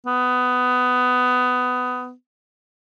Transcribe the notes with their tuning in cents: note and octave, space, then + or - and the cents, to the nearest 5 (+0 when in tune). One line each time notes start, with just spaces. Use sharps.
B3 +20